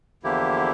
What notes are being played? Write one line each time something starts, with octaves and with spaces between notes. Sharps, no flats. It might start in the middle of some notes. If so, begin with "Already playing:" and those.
E2 D3 F3 A#3 E4 G4